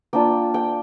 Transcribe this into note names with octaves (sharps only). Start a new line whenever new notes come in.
A#3 D4 F4 G5
G5